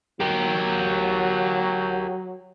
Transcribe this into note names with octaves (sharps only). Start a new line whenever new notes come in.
F#3 G4 A#4